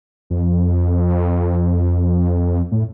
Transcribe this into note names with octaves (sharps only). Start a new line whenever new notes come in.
F2
A2